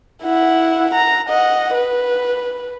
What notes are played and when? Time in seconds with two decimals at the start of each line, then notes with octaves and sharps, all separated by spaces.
0.22 E4 F#5
0.91 F#5 A#5
1.28 D#5 F#5
1.74 B4